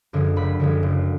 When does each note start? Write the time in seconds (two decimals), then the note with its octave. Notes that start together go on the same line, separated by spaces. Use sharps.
0.13 F#2 D3 F3 G#3
0.36 F#1 B5
0.60 F#2 D3 F3 G#3
0.83 F#1